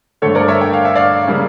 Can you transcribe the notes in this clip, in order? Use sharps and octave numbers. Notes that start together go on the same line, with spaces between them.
G2 D3 A3 A4 C#5
A#4 D5
C#5 E5
G5
F5
E5
D5 F5
C#3 G3 A#3